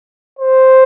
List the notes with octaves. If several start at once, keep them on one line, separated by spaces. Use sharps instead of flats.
C5